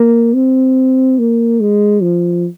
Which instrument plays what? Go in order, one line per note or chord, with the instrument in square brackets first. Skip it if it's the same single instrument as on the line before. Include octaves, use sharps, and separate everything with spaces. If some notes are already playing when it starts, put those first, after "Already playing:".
Already playing: [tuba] A#3
C4
A#3
G#3
F3